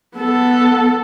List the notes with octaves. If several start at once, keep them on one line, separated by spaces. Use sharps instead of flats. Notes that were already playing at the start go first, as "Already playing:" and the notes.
B3 A4